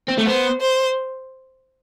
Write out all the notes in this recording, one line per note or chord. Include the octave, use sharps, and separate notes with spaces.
C4
A3
B3 C5
C5